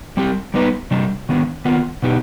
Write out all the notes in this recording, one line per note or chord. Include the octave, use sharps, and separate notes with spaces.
G3 C4 G4
G3 B3 D#4 B4
C3 G3 D4
D#3 B3 D4
D#3 B3 F4
B2 B3 D#4 G4